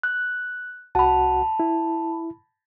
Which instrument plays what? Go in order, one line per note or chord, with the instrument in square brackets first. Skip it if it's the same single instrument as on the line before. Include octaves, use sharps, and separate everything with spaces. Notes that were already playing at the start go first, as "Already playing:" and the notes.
[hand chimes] F#6
[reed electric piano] C2 F#4 F#5 [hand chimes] A5 B5
[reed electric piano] E4